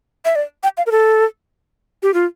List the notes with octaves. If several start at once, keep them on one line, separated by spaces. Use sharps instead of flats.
E5
D5
G5
F5
A#4
A4
G4
F4